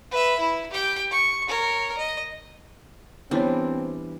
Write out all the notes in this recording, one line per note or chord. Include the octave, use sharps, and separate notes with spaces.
B4 E5
E4
G4 G5
C#6
A#4 C#5
D#5
E3 G3 B3 C4 D4 C#5